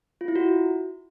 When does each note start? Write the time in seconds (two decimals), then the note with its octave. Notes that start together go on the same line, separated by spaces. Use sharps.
0.21 F4
0.28 E4
0.36 F#4